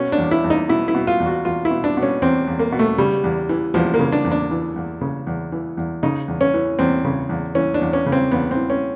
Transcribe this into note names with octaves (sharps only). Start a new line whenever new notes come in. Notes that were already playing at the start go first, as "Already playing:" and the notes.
Already playing: B2 C#4
D4
E2
E4
E2
D#4
B2 E4
E4
B2
F4
E2
F#4
E2 F4
E4
B2
D4
B2
C#4
E2 C4
E2
A#3
B2
A3
C#3 G3
E2
E3
E2 F3
A#3
C#3
D4
E2
D4
E3
E2
C#3
E2
E3
E2
C#3 D#4
E2
C#4
E3
E2 C4
C#3
E2
E3 C#4
D4
E2
C#4
C#3
C4
E2 B3
C4
E3
C#4